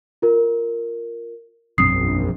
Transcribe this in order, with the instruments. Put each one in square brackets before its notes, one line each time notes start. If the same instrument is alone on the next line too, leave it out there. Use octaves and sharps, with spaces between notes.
[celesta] F4 A#4
[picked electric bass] E1 F#2 C4 [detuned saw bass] A#1 [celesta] D#6 C7